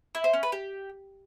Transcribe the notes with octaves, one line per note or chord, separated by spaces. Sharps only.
E4
C5
C#4
B4
G4